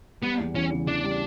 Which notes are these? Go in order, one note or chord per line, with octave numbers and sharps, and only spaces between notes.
G3 B3
E2
E3 C#4
C#3
E3 D4
G3